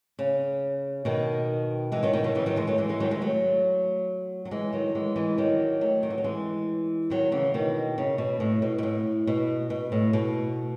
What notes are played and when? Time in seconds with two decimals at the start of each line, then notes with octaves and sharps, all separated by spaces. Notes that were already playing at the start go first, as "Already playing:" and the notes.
0.19 C#3
1.05 B2 D#3
1.92 E3 G#3
2.03 D#3 F#3
2.13 B2 D#3
2.24 B2 D#3
2.35 C#3 E3
2.46 D#3 F#3
2.56 E3 G#3
2.67 F#3 A3
2.78 E3 G#3
2.89 E3 G#3
3.00 D#3 F#3
3.11 E3 G#3
3.21 F#3 A3
4.45 F#3
4.51 E3 G#3
4.73 D#3 F#3
4.95 E3 G#3
5.16 E3 G#3
5.38 D#3 F#3
5.81 F#3 A3
6.03 D#3
6.10 E3
6.18 F#3
6.24 E3 G#3
7.10 D#3 F#3
7.32 C#3 E3
7.54 B2 D#3
7.98 C#3
8.18 B2
8.40 A2
8.62 B2
8.78 B2
8.83 A2
9.27 B2
9.70 B2
9.92 A2
10.13 B2